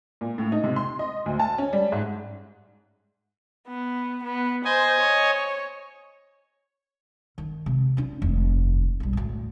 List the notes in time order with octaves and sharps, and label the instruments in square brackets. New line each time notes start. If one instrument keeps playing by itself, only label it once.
[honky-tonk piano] A#2
A2
D#4
C3
C6
D#5
D2
A5
C#4
G3
G#2
[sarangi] B3
B3
[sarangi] C5 [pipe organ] D#5 G#5
[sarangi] C#5
[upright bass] D#3
C3
D4 F4
F1 D#2
B1 G3
D2 A2